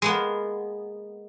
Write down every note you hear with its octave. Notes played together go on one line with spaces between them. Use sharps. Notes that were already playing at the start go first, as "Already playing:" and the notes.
G#3 A#3 B3